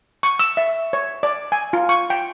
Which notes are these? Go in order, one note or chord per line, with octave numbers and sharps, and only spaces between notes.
C#6
E6
E5
C#5
D5
G#5
F4
C#6
G5